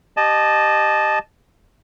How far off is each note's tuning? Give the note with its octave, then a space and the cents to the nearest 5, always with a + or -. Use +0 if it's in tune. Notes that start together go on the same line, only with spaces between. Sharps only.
G4 +0 D#5 -20 A5 -15